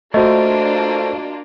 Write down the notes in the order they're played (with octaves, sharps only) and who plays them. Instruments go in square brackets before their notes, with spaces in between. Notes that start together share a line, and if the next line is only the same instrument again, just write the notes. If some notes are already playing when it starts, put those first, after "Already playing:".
[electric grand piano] A3 [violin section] A#3 D4 F4 [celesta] F#4 D#5 [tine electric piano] A4 C5